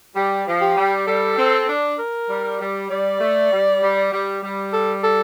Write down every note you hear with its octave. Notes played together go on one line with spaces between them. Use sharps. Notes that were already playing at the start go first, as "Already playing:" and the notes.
G3 G4
F3
G4
G3
G3 A4
C4
D4
A#4
G3
G3
G3 D5
A3
G3
G3
G3
G3
A4
A4